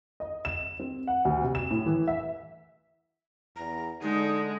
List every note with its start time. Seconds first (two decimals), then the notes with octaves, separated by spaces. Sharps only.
0.20 D#5
0.45 E7
0.79 C4
1.07 F#5
1.25 D2
1.43 C3
1.55 E7
1.71 A2
1.86 E3
2.08 E5
3.56 E2 A#5
4.02 D3 G#3 D#4